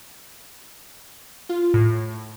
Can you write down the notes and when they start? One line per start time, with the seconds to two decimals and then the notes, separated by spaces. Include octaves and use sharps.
1.49 F4
1.74 A2